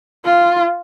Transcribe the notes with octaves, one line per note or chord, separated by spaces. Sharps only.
F4